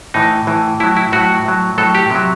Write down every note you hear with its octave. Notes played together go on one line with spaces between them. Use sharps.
A2 E3 D#4
A2 E3
A2 F#3 E4
E4
A2 F#3 F#4
A2 F#3
A2 F#3 A4
G4
C3 F#3